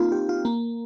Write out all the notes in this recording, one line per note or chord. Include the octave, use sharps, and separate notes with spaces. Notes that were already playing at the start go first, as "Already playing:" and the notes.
Already playing: A#3 C4 D#4 F4
G4
F4
A#3